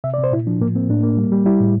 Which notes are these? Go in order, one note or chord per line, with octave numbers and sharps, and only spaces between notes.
C3 E5
D5
C3
C5
A#2 E4
F3 D4
A2 A#3
A#3 C4
A2 D4
A#3
G3
G3
G3 E4
A2